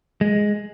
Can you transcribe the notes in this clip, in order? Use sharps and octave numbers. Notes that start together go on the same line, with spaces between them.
G#3